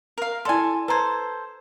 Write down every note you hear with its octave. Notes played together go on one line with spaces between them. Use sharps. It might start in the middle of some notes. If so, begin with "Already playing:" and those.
A#4 F5
E4 A4 D5 G#5 C6
A4 B4 C5 A#5 G#6